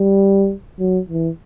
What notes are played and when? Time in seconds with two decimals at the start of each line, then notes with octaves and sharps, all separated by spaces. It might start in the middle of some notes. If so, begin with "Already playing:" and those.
Already playing: G3
0.80 F#3
1.09 E3